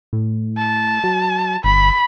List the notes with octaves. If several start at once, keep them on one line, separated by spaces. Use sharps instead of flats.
A2
A5
F#3
G1 B5